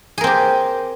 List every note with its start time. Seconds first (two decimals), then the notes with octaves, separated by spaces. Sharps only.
0.18 G#4
0.21 A#4
0.24 C4
0.27 G4